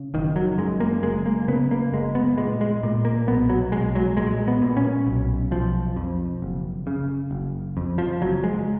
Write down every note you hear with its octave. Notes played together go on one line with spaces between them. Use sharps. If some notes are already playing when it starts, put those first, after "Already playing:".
Already playing: C#3
F#1 D#3
F#3
F#2 G#3
A#3
F#1 G#3
A#3
C#3 B3
A#3
F#1 G#3
B3
A#2 G#3
G#3
A#2
A#3
B1 B3
F#3
B1 G#3
F#3
A#2 G#3
B3
A#2
C#4
B1
B1 F3
F2
F#1
C#3
F#1
F2
F3
F#1 F#3
G#3